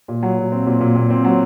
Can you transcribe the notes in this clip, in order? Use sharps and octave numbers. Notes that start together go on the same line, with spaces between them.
A#2
F#3
A#2
C4
A#2
A#2
A#2
C4
F#3